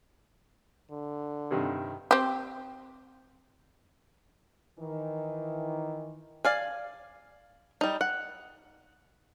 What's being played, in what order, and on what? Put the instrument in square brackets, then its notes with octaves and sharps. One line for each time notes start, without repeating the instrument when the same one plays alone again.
[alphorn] D3
[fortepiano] G2 C3 D#3
[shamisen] C4 G4
[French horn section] D#3 E3
[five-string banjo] D5 F5 G#5
G3 D#4
F#5